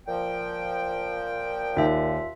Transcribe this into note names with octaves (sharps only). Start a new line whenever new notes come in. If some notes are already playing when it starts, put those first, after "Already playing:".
A#2 F3 G5
D#2 F4 E5